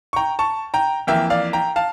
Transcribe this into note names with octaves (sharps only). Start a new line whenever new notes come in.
C#6
G5 A#5
A5 C#6
G5 A#5
F2 E3 A#3 E5 G5
D5 F5
G5 A#5
F5 A5